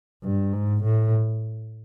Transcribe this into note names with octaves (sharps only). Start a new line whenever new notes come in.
G2
G#2
A2